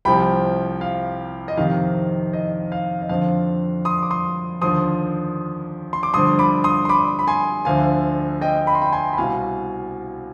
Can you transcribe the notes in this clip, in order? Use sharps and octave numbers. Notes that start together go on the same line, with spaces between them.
C2 C3 F3 G5 B5
F5
D#5
F2 C3 D#3 F5
D#5
F5
D#5
F2 D3 F3 F5
C6 D#6
D6
C6 D#6
D#2 D3 F3 C6 D#6
C6
D6
G2 D3 F3 C6 D#6
B5 D6
C6 D#6
C6
B5 D6
B5
G#5 C6
D2 D3 F3 F5 G#5
D#5 G5
B5
C6
G5 B5
G#5 C6
B5
C2 B2 F5 G#5